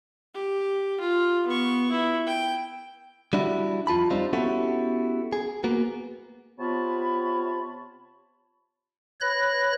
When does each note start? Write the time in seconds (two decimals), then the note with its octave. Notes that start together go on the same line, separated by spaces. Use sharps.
0.34 G4
1.00 F4
1.47 B3 C#6
1.91 E4
2.27 G5
3.33 G3 D4 E4 F#4
3.87 F2 F4 A5 B5
4.10 G3 C4 D4 D#4 F4
4.33 B3 C#4 E4 F#4 G4 A4
5.33 G#4
5.64 A#3 B3 F#4
6.59 C3 B3 F4 C#5 A5 B5
9.21 B4 C#5 B5 F#6 A#6